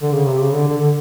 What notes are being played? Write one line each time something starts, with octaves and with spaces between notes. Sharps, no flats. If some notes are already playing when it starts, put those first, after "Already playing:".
D3
C#3
C3
C#3
D3
D3
D3